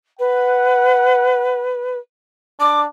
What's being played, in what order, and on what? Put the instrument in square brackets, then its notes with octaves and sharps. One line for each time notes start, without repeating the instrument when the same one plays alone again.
[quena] B4 [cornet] F#5
[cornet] D4 [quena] D6